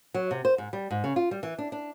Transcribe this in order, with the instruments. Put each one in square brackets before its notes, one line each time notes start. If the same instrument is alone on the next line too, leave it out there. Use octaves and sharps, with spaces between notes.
[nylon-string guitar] F#3
C3
C5
G#2
G3
G#2
C#3
F4
G3
E3
D4
D4